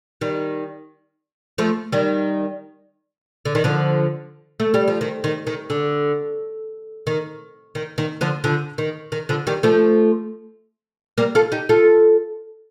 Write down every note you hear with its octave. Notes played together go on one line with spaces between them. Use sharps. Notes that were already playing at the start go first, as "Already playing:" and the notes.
D#3 G3
F3 A3
D#3 G3
D3
D#3
D3 F3
A3
G3
F3
D#3
D#3
D#3
D3
D#3
D#3
D#3
D3 F3
D3 F3
D#3
D#3
D3 F3
D#3 G3
F3 A3
G3 A#3
F4 A4
D#4 G4
F4 A4